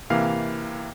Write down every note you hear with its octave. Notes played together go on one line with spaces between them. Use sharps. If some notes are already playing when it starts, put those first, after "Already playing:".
C3 E3 A#3 F5